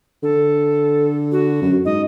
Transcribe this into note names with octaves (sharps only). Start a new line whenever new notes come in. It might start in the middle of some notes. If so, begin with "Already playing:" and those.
D3 A4
F#4
F#2
G#2 D#5